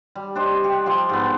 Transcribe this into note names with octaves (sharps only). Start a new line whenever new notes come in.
G3
D4 G4 C5 D#5
G4
F3 G4 C6
G#2 B3